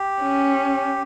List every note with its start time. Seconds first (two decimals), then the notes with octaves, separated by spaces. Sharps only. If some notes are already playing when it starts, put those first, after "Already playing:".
Already playing: G4
0.22 C#4